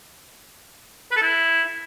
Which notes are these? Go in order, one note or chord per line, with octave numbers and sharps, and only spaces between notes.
B4
A4
E4